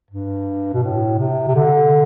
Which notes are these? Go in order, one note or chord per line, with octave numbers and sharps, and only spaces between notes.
G2
B2
A2
C3
C3
D3